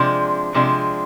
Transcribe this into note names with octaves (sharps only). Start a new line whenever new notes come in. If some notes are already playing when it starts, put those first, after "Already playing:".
Already playing: C3 F3 G#3 D4
C3 F3 G#3 D4